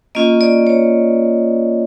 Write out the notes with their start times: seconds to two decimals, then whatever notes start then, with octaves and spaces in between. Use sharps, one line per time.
0.15 A#3 C#4 F4 D#5
0.41 D5
0.67 C#5